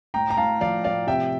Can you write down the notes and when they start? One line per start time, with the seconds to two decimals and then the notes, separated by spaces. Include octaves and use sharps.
0.14 A2 G5 A#5
0.30 A#5
0.37 A2 F5 A5
0.61 F3 D5 F5
0.84 A2 D5 F5
1.07 C3 E5 G5